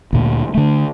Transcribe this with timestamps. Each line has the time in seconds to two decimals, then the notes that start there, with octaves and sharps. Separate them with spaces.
0.13 D2 A#2
0.54 D3 A3